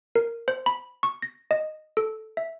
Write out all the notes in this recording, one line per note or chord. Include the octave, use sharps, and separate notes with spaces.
A#4
C5
B5
C#6
A#6
D#5
A4
E5